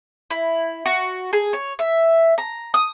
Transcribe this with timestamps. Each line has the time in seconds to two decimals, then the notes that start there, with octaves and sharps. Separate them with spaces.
0.31 E4
0.86 F#4
1.33 G#4
1.53 C#5
1.79 E5
2.38 A#5
2.74 D#6